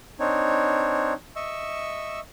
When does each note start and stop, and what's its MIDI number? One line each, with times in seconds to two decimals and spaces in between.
0.20 1.13 60
0.20 1.13 62
0.20 1.13 63
0.20 1.13 73
1.36 2.20 75
1.36 2.20 76
1.36 2.20 85
1.36 2.20 88